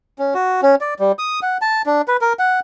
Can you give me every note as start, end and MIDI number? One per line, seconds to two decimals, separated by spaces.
0.19 0.34 61
0.34 0.61 66
0.62 0.75 61
0.81 0.94 74
0.99 1.12 55
1.19 1.40 87
1.43 1.58 78
1.61 1.82 81
1.86 2.02 62
2.08 2.17 71
2.21 2.33 70
2.39 2.60 78